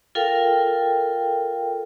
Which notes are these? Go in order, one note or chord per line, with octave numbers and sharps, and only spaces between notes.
F4 A4 A#4 F5 G5